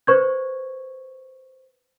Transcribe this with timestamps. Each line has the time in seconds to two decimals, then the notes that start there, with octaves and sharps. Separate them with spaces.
0.07 B4 C5 C#6 G6 G#6